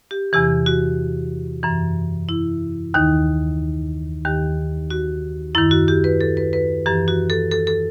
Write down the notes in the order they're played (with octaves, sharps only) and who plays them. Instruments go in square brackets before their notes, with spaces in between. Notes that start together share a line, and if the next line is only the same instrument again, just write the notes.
[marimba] G4
E2 C3 E3 G4
F#4
F#2 E3
E4
D#2 D#3 D#4
D#2 D#3 G4
F#4
F#2 D#3 E4
F#4
G4
B4
A4
B4
B4
F#2 E3 G4
F#4
A4
A4
A4